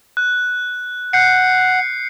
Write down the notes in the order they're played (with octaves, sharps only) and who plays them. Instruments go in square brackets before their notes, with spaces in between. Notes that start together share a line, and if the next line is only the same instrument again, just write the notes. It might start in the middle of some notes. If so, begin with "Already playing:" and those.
[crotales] F#6
[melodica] F#5 [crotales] G6 C7 C#7